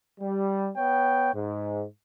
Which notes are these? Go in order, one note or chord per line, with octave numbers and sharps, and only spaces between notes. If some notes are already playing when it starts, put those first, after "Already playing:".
G3
B3 C#5 G5
G#2